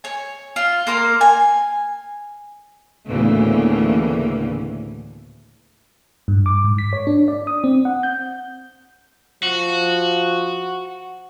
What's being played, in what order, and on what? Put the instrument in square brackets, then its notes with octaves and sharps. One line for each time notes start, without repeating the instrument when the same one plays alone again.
[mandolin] C#5 G#5
F4
A#3 A#4 C6
G#5
[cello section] D2 A2 C#3 E3 A#3 B3
[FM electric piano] G2
D6
G#2
B6
C#5
D4
D5
D#6
C4
F#5
G6
[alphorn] F3 [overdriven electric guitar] F#4